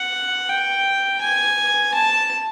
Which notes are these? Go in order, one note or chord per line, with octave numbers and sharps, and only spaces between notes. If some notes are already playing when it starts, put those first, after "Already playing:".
Already playing: F#5
G5
G#5
A5